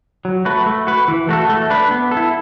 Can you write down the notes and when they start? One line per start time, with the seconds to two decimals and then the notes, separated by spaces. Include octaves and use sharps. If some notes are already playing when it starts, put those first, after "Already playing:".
0.25 F#3
0.45 A3 F#4 B4
0.66 A3
0.87 F#4 B4
1.08 E3
1.29 A3 F#4 A4
1.49 A3
1.70 D4 B4
1.91 B3
2.11 A4
2.17 E4